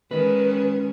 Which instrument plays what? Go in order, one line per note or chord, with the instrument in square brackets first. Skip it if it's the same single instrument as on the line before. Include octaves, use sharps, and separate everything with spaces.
[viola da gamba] D#3 G#3 C#4 [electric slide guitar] B4